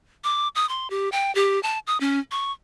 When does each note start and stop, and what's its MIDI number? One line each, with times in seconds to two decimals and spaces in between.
0.24 0.48 86
0.55 0.68 87
0.69 0.90 84
0.90 1.09 67
1.12 1.33 79
1.35 1.62 67
1.63 1.79 81
1.87 2.00 87
2.00 2.20 61
2.31 2.52 85